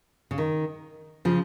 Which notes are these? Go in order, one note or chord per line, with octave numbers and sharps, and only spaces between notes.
C#3
D#3
C#3 F3